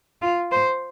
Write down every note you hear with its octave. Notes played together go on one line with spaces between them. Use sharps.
F4
C5